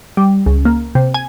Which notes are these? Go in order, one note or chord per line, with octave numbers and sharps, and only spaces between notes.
G3
C#2
A#3
C3
G#5